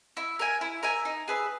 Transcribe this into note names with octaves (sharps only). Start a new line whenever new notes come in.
E4
A#4 E5 G#5
E4
A#4 E5 G#5
D#4
G#4 B4 E5